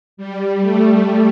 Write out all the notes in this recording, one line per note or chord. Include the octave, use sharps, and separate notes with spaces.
G3
A3